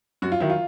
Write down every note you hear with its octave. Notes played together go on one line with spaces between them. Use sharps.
F#2 F#4
F4
D#3 F#3 E4
F4